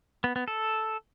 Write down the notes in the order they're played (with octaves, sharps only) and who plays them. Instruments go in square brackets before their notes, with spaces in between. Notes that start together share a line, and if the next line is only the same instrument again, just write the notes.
[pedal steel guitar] B3
B3
A4